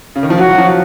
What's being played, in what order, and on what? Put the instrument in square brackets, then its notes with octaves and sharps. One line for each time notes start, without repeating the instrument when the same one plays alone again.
[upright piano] C#3
D#3
F3
[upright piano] F#3 [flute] F#4
[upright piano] F#3
F3